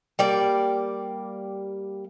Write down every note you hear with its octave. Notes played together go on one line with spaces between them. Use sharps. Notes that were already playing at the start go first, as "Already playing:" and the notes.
G3 A#3 D5